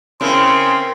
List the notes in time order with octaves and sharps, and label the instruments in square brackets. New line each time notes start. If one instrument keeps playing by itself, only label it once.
[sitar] C#3 E4 [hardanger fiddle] C4 A#4 [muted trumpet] C6